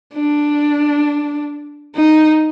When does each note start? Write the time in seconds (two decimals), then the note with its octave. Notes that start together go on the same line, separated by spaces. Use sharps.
0.14 D4
1.96 D#4